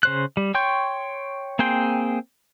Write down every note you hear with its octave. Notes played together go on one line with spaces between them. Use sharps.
C#3 C5 F#6
G3
C#5 G5 C6 C#6 G6
A#3 C4 G#4 G5 C6